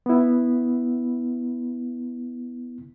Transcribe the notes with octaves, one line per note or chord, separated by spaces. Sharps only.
B3 E4